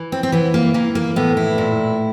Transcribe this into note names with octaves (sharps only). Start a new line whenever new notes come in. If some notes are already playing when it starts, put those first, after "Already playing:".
Already playing: E3
C4
C4
E3 B3
A#3
E3 A#3
A#3
A2 B3
E4
A#2